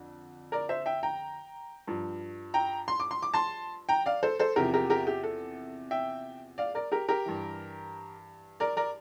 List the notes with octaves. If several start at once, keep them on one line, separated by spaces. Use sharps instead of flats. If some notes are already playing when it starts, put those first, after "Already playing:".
Already playing: F2 D3
A#4 D5
C5 E5
E5 G5
G5 A#5
G2 F3
G5 A#5
C6
D6
C6
D6
A5 C6
G5 A#5
D5 F5
A4 C5
A4 C5
E2 C3 F3 G4 A#4
G4 A#4
G4 A#4
G4
A4
E5 G5
D5 F5
A#4 D5
G4 A#4
G4 A#4
G2 E3
A#4 D5
A#4 D5